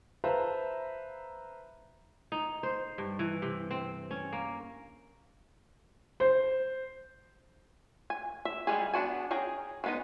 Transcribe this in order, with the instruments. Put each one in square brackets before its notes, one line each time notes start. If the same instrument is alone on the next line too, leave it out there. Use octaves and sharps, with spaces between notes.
[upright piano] B4 C5 E5 F5 A5 A#5
[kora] D#4
C5
G2
E3
C3
C4
C#4
A#3
[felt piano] C5
[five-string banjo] G#5
E5
G3 G#3 E4 G#4
B3 D4 F#4 G#5
C#4 G#4 G5 A#5
F3 G#3 B3 D#4 D#5